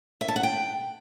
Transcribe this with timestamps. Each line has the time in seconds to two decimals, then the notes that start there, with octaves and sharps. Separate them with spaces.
0.21 E5
0.28 A5
0.36 F#5
0.43 G5